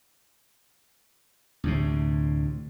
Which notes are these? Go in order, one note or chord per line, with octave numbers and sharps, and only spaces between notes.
D2 A2 C3